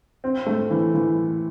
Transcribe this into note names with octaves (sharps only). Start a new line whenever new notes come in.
C4
A3
E3
E3